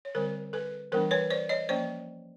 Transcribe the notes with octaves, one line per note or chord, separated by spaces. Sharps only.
C#5
D3 G3 C4 A#4 C5
A4 B4
E3 G3 B3 D4 A#4 C5
B4 C#5
C5 D5
C#5 D#5
F3 A#3 C#4 C5 D5